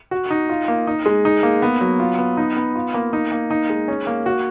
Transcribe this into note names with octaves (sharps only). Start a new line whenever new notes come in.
F#4
D#4
F4
A#3
D#4
G#3
D#4
A#3
B3
F#3
F4
B3
D#4
B3
F4
A#3
D#4
A#3
D#4
G#3
C#4
A#3
F#4